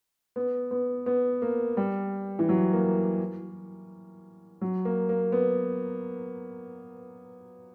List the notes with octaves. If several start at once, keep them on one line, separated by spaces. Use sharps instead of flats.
B3
B3
B3
A#3
G3
E3
F#3
A#3
F#3
A#3
A#3
B3